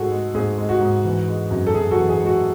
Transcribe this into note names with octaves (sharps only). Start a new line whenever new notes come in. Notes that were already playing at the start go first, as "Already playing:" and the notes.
Already playing: G#2 G#3 F#4 G#4 A4
G#3
G#2 G#4
G#3
F#4
G#2
E3
G#3
F#2
A4
F#2 G#4
F#4 A4
E3
G#4
G#3
F#4